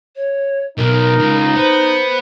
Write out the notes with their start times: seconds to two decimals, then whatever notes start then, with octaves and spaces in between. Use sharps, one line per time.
0.16 C#5
0.78 B1 D#4 A#4
1.19 C#2
1.56 B3 C5